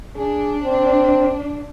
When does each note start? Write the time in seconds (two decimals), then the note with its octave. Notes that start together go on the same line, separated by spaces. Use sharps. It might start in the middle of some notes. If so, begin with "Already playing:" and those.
0.16 D4 G#4
0.63 C4